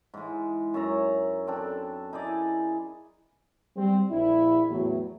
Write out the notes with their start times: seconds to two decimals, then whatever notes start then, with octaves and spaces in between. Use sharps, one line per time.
0.14 G#2 E3 G#3
0.74 F#2 C#5 E5 A#5
1.47 C4 D4 A4
2.13 D#4 E4 G#4 D5
3.77 G3 C4
4.11 A#1 E4
4.70 E2 A2 F#3